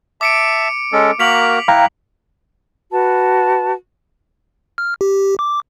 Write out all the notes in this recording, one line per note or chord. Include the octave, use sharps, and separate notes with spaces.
E5 A5 D6 C#7 D7
G#3 C#4 A4
A#3 F#4 A#4 B6 F7 F#7
E4 F5 G5 A#5 F#6
F#4 B4 A5
F6
G4
D6